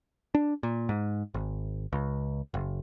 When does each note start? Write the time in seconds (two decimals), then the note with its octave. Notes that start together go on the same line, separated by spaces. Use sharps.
0.35 D4
0.63 A#2
0.89 G#2
1.34 G#1
1.93 C#2
2.54 F#1